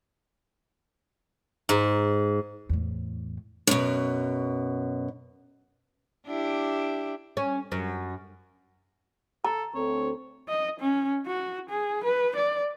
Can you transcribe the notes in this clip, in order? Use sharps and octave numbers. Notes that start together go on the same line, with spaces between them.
G#2
E2 A2
F#2 B2
D4 E4 G4
C#4
F#2
A4 A#5
D2 C4 A4 C#5
D#5
C#4
F#4
G#4
B4
D5